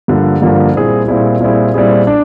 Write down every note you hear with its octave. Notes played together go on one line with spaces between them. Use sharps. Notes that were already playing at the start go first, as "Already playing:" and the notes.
G2 D3 F3 A#3
G2 D3 F3 A#3
A#2 G3 C4 E4 G#4
A#2 G3 C4 E4 G#4
A#2 G3 C4 E4 G#4
A#2 G3 C4 E4 G#4
D4